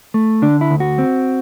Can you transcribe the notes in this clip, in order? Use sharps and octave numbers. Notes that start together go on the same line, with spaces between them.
A3
D3 D4
E4
D2
F#4
C4